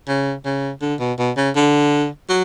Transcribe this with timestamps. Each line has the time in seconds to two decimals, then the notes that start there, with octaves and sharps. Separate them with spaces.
0.08 C#3
0.45 C#3
0.81 D3
1.00 B2
1.18 B2
1.37 C#3
1.56 D3
2.29 F#3